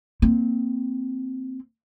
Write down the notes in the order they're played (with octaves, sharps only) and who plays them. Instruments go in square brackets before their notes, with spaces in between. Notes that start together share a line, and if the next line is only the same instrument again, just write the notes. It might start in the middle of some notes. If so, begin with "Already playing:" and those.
[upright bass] A#3 C4